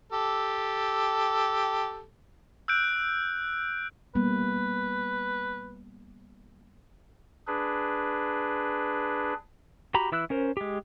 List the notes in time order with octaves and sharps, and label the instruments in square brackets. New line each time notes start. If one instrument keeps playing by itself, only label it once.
[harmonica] G4 A4
[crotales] E6 F#6 G6 D7
[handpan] G3 A#3 B3 [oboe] B4
[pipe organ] D4 G#4 B4
[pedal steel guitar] F#4 G4 A#5 B5
E3 E4 E6 F#6
C#4 A#4 C5
G#3 G4